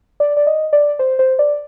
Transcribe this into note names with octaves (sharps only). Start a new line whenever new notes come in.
D5
D5
D#5
D5
C5
C5
D5